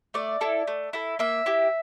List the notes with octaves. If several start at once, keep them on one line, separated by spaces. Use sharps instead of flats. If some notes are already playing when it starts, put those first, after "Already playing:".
A3 D5
E4 A4
A3
E4 A4
A#3 E5
E4 G4